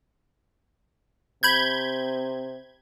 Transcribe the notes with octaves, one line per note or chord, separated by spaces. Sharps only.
C3 B5 G6 G#6